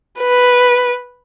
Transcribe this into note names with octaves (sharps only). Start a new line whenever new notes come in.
B4